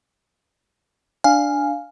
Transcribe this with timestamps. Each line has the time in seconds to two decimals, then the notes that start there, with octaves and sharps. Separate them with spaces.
1.24 D4 F5 G#5